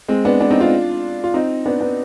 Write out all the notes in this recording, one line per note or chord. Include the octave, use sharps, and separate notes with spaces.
G#3 C4
B3 D4
B3 D4
C4 D#4
D4 F4
F4
C4 D#4
B3 D4
B3 D4